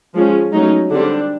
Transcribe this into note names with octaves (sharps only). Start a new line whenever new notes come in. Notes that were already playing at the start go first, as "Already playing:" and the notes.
F3 G#3 C#4
F#3 A3 C#4 D#4
D3 G3 C4 D4